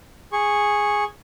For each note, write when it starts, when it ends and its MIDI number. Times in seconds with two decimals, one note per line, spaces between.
0.32 1.04 68
0.32 1.04 85